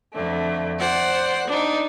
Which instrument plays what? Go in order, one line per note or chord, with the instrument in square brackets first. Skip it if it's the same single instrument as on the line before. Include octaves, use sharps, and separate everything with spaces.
[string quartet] F2 D3 A3
C5 D5 F#5
D4 D#4